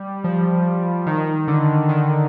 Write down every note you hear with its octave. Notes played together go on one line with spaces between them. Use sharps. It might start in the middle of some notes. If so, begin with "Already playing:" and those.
Already playing: G3
F3
D#3
D3
D#3